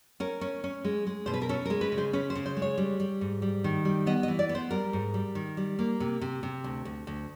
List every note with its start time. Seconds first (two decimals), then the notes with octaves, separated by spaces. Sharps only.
0.20 C#4 A#4
0.41 C#4
0.64 C#4
0.84 G#3
1.07 G#3
1.26 B2 C5
1.34 B4
1.42 A#4
1.49 C#4 A4
1.65 A#4
1.70 G#3
1.81 B4
1.92 C#3
1.98 C5
2.13 C#4 B4
2.30 C5
2.35 C#3
2.46 C5
2.57 G#3
2.62 C#5
2.78 G3
3.00 G3
3.21 G#2
3.42 G3
3.64 D#3
3.85 G3
4.06 B3 D#5
4.23 D#5
4.28 E3
4.39 D5
4.49 B3
4.55 C5
4.71 G3 A#4
4.93 G#2
5.14 G3
5.35 D#3
5.57 G3
5.79 A#3
6.00 C3
6.21 C3
6.43 C3
6.64 D2
6.85 D2
7.07 D2